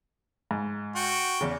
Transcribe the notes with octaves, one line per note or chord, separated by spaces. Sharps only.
G#2
F#4 G5
E2 C#3